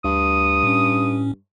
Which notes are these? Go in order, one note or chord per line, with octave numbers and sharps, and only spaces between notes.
D2 G2 D#6
A2 C#4